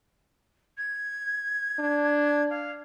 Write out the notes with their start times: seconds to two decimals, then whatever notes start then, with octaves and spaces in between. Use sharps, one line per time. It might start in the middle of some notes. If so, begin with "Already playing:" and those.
0.78 G#6
1.79 D4
2.50 F5